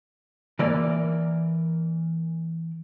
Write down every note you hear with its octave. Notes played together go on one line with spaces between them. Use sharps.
E3 A#3 A#4 D5